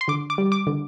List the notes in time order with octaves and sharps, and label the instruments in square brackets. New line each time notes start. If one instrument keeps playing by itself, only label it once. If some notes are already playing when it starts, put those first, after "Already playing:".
[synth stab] C6
D3 D6
D6
G3
D6
D3